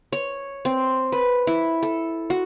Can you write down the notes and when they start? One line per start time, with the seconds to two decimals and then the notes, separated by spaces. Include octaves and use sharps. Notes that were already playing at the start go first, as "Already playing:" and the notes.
0.12 C#5
0.65 C4
1.12 B4
1.47 E4
1.83 A4
2.30 F#4